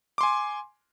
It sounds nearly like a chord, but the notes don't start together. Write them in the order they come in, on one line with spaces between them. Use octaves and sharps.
D6 C6 G#5